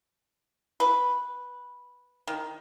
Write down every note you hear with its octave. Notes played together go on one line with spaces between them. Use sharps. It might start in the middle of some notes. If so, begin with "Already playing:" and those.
B4
D#3